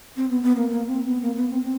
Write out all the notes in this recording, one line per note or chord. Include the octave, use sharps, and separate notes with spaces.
C4
B3
B3
A#3
A#3
C4
B3
A#3
B3
C4
C4